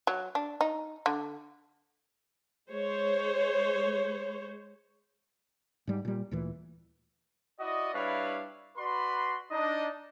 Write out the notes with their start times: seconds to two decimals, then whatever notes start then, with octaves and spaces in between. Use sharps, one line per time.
0.07 F#3
0.35 D4
0.61 D#4
1.06 D3
2.71 G#3 C5 C#5
5.87 G#2 G3
6.05 A#2 G3
6.31 D2 A#2 E3
7.59 E4 F#4 D5 D#5
7.94 G3 D4 E4 B4 C#5 F5
8.77 F#4 B4 D5 B5 C6
9.51 D4 D#4 D#5